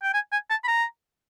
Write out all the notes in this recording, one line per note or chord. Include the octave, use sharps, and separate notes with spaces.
G5
G#5
G#5
A5
B5
A#5